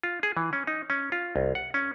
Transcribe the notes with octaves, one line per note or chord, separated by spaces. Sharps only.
F4
G#4
E3
C#4
D#4
C#4
F4
C2
F#5
C#4